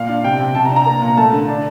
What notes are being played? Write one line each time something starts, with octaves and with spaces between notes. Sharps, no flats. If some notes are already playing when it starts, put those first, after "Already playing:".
Already playing: A#2 F5
D4
C3 G5
C3
C3 A5
A#5
D4
A#5
A#3
A#2
A3 A5
D3
D4